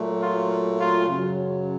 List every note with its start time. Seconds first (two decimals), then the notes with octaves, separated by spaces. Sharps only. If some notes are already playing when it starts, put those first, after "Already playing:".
Already playing: A#2 F#3 A3
0.20 F4
0.78 F4
1.07 F#2 C#3 F#3